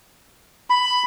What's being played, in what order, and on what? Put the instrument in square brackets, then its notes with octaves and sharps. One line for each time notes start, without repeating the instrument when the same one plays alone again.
[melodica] B5